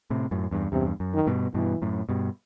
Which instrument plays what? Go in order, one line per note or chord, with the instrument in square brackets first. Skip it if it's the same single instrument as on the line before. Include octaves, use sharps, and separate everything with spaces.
[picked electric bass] A2 C3
F#2 A2
E2 G2
[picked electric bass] E2 G2 [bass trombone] C3
[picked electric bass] F#2
[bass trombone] D#3
[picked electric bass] G2 B2
[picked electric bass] G2 B2 [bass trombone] E3
[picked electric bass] F#2 A2
G2 B2